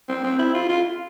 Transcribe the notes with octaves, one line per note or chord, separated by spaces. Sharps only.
C4
C4
E4
F4
F4